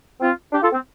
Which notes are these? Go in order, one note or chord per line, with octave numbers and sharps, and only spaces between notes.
C4 F4
D4 G4
F4 A4
C4